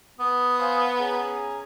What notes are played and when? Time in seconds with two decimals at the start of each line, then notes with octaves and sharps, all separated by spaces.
0.19 B3 D#6
0.58 C5 F5 G#5
0.99 C#4 G#4 A#5